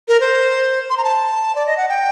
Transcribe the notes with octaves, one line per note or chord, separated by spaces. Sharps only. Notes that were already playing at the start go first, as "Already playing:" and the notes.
A#4
C5
C6
A#5
A5
D5
D#5
F#5
G5